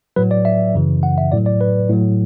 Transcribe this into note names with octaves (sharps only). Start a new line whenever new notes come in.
A2 F#3 B4
D5
E5
F#2 C#3 E3
F#5
E5
A2 F#3 D5
D5
B4
A2 F#3